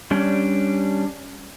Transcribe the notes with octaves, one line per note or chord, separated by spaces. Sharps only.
G3 C#4 D4